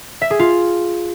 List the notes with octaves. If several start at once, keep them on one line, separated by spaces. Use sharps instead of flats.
E5
G#4
F4